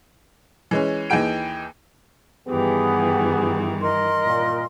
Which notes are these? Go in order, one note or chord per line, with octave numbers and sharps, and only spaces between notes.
E3 G#3 C#4
D#2 E3 D#4 G#4 G5 D7
G2 D#3 E3 B3 G4 G#4
A#4 D#5 C6
A#2